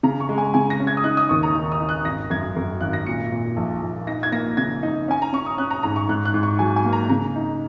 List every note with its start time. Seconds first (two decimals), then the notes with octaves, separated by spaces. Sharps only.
0.03 C#3 A#5
0.20 C#6
0.29 G#3
0.38 G#5
0.54 C#3 G#5
0.70 A#6
0.80 C#4
0.87 G#6
0.97 D#6
1.04 D#4 F#6
1.17 D#6
1.29 D#2 C#6
1.43 A#5
1.55 D#3
1.72 D#6
1.80 D#4
1.89 F#6
2.05 G#1 A#6
2.30 F#2 G#6
2.56 F#2
2.81 G#1 F#6
2.93 A#6
3.06 A#2 C#7
3.32 A#2
3.57 A#1
3.82 A#1
4.07 D#4 A#6
4.23 G#6
4.32 A#3 A#6
4.57 C#3 G#6
4.83 D#4
5.08 C#4 G#5
5.22 A#5
5.33 C#4 C#6
5.46 D#6
5.58 C#4 F#6
5.71 A#5
5.83 G#2 A#5
5.96 C#6
6.09 G#2 F#6
6.25 F#6
6.34 G#2
6.43 C#6
6.59 F#3 G#5
6.76 G#5
6.85 A#3
6.93 A#5
7.09 C#3 A#5
7.36 D#4